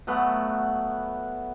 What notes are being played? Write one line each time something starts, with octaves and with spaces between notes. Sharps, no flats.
F#3 A3 B3 F#5